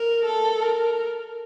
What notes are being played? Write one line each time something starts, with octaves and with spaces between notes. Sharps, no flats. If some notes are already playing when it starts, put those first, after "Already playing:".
Already playing: A#4
A4
A#4